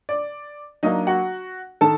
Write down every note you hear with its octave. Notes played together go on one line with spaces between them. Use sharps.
D5
F#3 A#3 D4 D#4 D#5
F#4 F#5
D#3 A4 A5